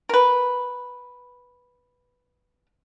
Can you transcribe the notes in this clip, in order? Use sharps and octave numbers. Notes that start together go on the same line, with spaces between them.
A#4 B4